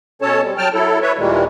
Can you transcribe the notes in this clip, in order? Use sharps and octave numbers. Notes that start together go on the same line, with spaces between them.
B2 C#4 A4 C#5 A5
G3 C4
F#3 G5 A5 F6
F#3 E4 A4
B4 C#5 E5
D#2 A#2 D#3 E3 G3 G#3